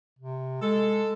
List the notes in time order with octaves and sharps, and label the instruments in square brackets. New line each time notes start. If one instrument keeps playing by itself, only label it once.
[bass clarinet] C3
[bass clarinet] G#3 [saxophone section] A4